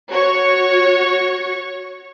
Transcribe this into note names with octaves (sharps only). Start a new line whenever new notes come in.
F#4 C#5 C#6